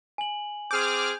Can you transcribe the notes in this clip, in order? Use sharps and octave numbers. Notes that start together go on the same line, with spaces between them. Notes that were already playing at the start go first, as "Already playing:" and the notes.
G#5 F#7
C4 G#4 D6 F6 G6